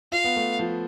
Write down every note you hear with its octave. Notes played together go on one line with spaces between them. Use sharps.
F4 F5
B3
A3
F3